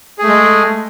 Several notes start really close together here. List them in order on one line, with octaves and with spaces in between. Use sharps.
G#4 A3 G#3